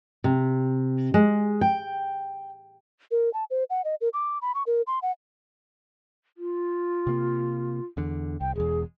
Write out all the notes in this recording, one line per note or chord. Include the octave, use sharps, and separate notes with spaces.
C3
G#3
G5
A#4
A5
C5
F#5
D#5
A#4
D6
B5
C#6
A#4
C6
F#5
F4
C3 A#3
E2 D3
C2 G5
E1 E2 G#4